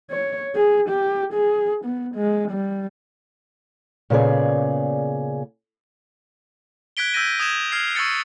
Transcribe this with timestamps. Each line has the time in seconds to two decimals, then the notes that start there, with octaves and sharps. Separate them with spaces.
0.11 C#5
0.55 G#4
0.89 G4
1.33 G#4
1.85 B3
2.15 G#3
2.51 G3
4.10 A#2 C#3 B3 G#4 D5
6.97 F#6 G#6 B6 D7 G7
7.14 E6 G6 G#6 A#6 D#7
7.40 D#6 G#6 E7 F7
7.72 F6 G#6 C7
7.95 C#6 E6 G#6 A6 C#7